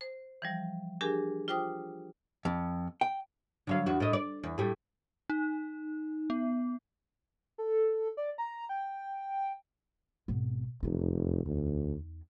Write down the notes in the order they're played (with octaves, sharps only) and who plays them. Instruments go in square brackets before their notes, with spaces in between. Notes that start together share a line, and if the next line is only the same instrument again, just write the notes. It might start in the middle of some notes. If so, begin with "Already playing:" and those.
[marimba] C5
E3 F3 G3
D4 G4 G#4 A#4 G#5
F4 C5 G5 D6 D#6
[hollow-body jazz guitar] F2
G5
[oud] D3 F#3 F5
E2 F#4
A2 D#5
D5
E2
A2 G3
[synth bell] D#4
B3
[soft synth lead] A4
D5
A#5
G5
[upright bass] G#1 B2
[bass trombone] F1 [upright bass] E2 D#4
[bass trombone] D2